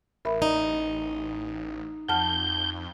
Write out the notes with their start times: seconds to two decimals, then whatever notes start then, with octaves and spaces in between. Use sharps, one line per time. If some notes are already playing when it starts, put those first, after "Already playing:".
0.25 A1 A#4 E5 B5
0.42 D#4
2.09 F2 F#5 A5 F6 G6